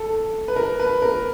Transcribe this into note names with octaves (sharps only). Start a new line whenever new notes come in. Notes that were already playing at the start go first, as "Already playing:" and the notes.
Already playing: A4
B4
A#4
B4
A#4